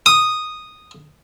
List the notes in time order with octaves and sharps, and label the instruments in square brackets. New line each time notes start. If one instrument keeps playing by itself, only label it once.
[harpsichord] D#6